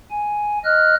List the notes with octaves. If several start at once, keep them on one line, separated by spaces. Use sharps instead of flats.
G#5
D#5 F6 F#6